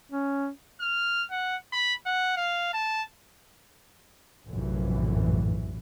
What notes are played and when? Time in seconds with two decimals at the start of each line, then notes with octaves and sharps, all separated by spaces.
0.12 C#4
0.81 F6
1.30 F#5
1.73 B5
2.07 F#5
2.37 F5
2.74 A5
4.49 F1 A#1 F#2 A2 E3